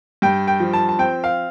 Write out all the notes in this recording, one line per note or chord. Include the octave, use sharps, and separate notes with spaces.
G2 G5
G5
F3
A5
A5
C4 G5
F5